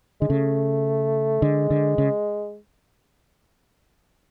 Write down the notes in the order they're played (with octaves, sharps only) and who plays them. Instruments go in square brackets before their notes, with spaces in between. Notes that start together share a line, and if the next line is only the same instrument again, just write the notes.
[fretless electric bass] D3 [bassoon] G#3
[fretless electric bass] C#3 [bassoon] A3
[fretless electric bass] D3 [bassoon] G#3
[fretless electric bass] D3
C#3